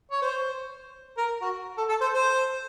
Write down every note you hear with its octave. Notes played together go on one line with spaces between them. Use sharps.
C#5
C5
A#4
F#4
A4
A4
C5
C5